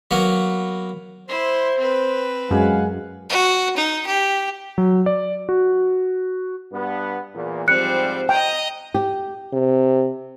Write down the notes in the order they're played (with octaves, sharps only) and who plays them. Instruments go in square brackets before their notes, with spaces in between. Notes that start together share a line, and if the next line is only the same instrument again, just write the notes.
[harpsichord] F#3 A#3 B3
[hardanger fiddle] E4 C6 [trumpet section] C5
[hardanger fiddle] C4 B4
[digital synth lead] F#2 [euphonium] G#3 [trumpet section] F5 F#5 G#5
[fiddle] F#4
D#4
G4
[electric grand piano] F#3
D5
F#4
[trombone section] G2 B3
E2 A#2
[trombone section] G#2 F3 G3 [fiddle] C4 C5 [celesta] F#6 C#7
[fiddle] D#5 A#5 [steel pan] G5
[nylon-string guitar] G4
[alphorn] C3